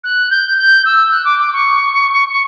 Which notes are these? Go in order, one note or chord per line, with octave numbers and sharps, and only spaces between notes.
F#6
G6
G6
E6
F#6
D6
D6
C#6